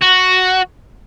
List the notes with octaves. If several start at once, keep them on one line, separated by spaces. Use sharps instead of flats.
F#4